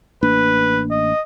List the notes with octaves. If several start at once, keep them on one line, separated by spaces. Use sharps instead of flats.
A1 A#3 D4 B4
D#5